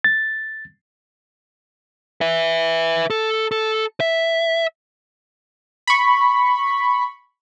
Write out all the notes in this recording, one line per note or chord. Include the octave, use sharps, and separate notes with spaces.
A6
B4 E5
A4
A4
E5
B5 C#6